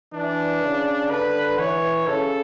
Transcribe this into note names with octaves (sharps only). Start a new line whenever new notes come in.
E3 D4
C#3
D3 B4
E3 C#5
C#3 A4